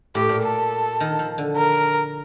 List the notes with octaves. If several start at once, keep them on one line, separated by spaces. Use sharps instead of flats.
A2 G4
A#2
A4
D#3
F3
D3
A#4